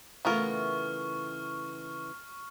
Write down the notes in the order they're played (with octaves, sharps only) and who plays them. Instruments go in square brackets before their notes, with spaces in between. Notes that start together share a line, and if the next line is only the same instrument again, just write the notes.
[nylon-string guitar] C#3 E3 A3 [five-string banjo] B3 F4 A#4 [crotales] C#6 F6